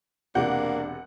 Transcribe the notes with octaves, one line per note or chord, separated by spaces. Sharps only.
E1 C3 A#3 D4 F#5 G6